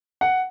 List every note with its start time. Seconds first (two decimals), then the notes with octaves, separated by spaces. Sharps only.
0.21 F#5